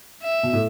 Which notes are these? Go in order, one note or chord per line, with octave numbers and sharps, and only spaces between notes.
E5
B2
A2